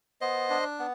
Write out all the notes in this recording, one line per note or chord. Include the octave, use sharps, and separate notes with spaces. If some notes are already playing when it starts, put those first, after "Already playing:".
B3 C5 D#5
D4
B3